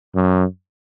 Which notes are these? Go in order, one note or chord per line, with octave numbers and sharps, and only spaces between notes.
F#2